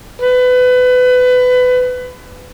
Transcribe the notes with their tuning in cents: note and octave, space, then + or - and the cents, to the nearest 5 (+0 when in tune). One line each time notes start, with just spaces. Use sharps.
B4 +25